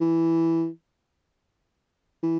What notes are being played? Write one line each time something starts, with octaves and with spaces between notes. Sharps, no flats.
E3
E3